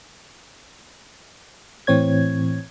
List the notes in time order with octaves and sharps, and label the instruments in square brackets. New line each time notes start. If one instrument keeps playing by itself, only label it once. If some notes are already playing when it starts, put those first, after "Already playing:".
[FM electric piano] A2 E3 C4 C#5 G#6